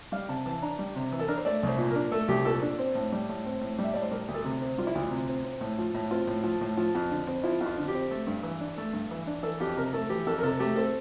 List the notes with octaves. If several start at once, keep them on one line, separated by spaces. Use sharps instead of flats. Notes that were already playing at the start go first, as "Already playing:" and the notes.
G3 F5
C3 A5
E3 A5
D4 A#5
G3
C3
E3
A4
D4 A#4
C5
A3 D5
C2 C5
A#2
A#4
D4
A3 A4
C2 G4
A#2 A4
D4
C4
A2
G3
A2
C4
A2
G3
E5
A2 D5
C5
G3 A#4
D2
A4
C3
C4
G3 F4
E4
D2 F4
C3
C4
C4
A2
F3
A2
C4 F4
A2
F3
A2
F3
F2
D3
C4
F3 E4
F2
F4
D3
G4
C4
A3
G2
E3
D4
A3
G2
E3
D4
E3 A4
F2 G4
C3 A#4
A3 A4
E3 G4
F2 A4
A#4
C3 A4
A3 G4
C4 A4